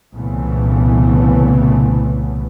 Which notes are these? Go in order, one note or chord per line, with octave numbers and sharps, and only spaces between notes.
C2 A#2 C#3 E3 A3 B3